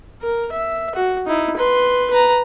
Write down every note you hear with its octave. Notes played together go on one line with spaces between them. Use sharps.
A#4
E5
F#4
D#4 E4
B4 C6
B4 A#5